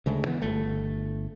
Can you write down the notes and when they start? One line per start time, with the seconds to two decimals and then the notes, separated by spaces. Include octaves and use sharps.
0.06 D2 C#3 G#3 A3
0.27 E3 B3
0.42 G1 A3